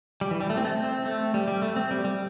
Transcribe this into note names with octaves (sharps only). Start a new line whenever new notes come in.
G3
E3
G3
A3
C4
A3
C4
A3
G3
G3
A3
C4
G3
G3